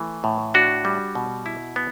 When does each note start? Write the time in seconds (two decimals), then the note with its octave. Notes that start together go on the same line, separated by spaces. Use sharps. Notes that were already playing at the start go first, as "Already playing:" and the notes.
Already playing: E3 A3
0.24 A2
0.54 D4 F#4
0.85 G3
1.15 B2
1.46 E4
1.76 B3